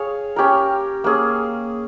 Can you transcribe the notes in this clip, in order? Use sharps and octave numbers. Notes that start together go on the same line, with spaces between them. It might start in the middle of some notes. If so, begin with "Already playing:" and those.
Already playing: G#4 C#5 F5
C#4 G4 A#4
A#3 C#4 G#4